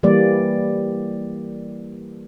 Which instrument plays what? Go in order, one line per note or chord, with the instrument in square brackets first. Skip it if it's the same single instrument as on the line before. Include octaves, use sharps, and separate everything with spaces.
[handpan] E3 G3 A#3 D5